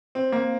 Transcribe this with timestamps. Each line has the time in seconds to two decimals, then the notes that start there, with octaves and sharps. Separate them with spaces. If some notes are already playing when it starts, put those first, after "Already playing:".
0.15 C4
0.32 A#3